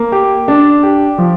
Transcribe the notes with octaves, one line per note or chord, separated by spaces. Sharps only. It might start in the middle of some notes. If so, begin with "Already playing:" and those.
Already playing: A#3
G4
D4
G4
F3